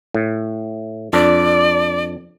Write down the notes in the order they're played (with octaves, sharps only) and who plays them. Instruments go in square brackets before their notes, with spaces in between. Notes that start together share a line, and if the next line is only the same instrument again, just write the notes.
[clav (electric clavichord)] A2
[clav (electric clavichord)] F2 D4 [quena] D5